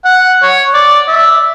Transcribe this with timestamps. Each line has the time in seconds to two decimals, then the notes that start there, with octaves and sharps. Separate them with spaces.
0.05 F#5
0.43 C#5
0.74 D5
1.08 E5